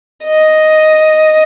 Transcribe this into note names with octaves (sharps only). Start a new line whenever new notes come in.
D#5